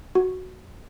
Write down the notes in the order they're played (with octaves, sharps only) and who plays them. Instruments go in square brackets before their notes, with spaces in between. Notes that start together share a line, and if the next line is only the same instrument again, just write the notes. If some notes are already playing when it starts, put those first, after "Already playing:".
[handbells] F#4